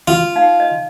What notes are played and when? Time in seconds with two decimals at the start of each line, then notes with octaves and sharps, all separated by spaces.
0.08 F4
0.36 D#4 F5
0.60 D#5